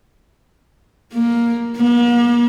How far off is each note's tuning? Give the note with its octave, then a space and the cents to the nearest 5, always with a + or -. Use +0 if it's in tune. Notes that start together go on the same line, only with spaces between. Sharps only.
A#3 +10
A#3 +45